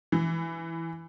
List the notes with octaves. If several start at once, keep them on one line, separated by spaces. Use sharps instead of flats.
E3